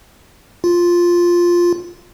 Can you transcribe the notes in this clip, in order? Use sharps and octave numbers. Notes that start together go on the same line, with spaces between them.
F4